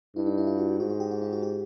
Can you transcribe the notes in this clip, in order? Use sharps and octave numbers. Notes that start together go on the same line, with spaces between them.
G2 E4
D#4
E4
F4
F#4
F#4
G#2 F#4
F#4
G4
F#4
F4
F#4
G4